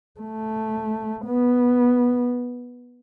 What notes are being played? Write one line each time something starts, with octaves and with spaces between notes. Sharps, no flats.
A3
B3